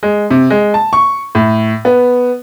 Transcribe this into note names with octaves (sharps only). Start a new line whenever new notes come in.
G#3
C3
G#3
A5
C#6
A2
B3